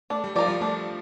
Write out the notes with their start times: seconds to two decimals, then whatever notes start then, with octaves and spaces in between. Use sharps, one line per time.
0.10 A3 D4
0.24 G3
0.35 F3 F4 A#4 D5
0.48 G3
0.61 A3 D4